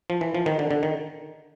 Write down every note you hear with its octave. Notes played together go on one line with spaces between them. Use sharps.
F3
E3
F3
D#3
D3
D3
D#3